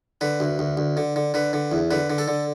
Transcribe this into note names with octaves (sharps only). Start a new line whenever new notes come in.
D3 B4
D2
D2
D2
D3
D3
D3 B4
D3
E2
D3 B4
D3
A4
D3